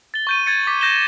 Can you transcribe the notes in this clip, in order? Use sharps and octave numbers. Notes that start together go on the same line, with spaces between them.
A6 G7
C#6 G6 D#7
G#6 A6 C#7
D6 B6
G6 A#6 E7 G7